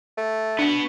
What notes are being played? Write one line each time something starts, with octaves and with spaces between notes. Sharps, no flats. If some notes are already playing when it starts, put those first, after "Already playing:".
A3
B3 D4 F#4